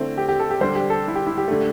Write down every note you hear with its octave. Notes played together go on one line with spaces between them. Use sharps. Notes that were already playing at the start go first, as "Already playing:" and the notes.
Already playing: D3 A3 C4 E4
G4
G4
A4
G4
D3 G3 D4 C5
G4
A4
E4
G4
E4
G4
D3 A3